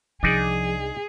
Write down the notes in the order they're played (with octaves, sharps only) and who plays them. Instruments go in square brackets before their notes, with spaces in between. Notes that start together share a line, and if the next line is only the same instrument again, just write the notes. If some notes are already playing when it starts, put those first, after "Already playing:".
[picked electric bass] C2 [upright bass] F3 [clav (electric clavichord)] D4 D#4 D5 [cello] G#4